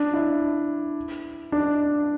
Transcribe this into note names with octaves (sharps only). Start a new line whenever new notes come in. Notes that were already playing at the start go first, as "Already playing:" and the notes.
Already playing: D4
E4
D4